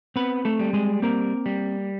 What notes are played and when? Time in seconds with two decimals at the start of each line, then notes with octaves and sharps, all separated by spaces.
0.16 B3 C4 B4
0.45 A3 A4
0.59 G3
0.73 G#3 G#4
1.02 A#3 C4 A#4
1.46 G3